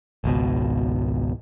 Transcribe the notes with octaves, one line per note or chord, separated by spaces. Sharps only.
G#1 C#2 B2